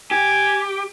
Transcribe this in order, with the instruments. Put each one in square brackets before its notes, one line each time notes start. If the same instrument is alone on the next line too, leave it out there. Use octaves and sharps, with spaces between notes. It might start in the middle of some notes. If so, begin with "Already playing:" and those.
[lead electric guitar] G4 [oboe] G#5